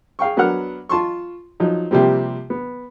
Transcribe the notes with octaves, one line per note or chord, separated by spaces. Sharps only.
G#4 F5 G5 C#6
F#3 B3 D4 A#4 F#5 F6
F4 A5 C6 C#6
F3 F#3 D#4
C3 F3 G3 A#3 C4
B3